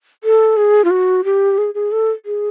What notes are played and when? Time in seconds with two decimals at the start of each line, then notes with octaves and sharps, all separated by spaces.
0.24 A4
0.57 G#4
0.85 F4
0.91 F#4
1.24 G4
1.58 G#4
1.74 G#4
1.92 A4
2.26 G#4